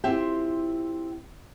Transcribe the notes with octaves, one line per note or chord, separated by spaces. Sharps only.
C4 E4 F4 G4 E5 G5